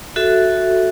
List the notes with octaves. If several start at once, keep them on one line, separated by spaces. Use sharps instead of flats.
F#4 A4 E5